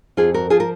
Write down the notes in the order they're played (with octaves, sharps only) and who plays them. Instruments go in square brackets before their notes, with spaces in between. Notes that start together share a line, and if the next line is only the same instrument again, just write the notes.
[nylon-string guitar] F2 F4 G#4
F#4 A#4
F3 F4 G#4
A#4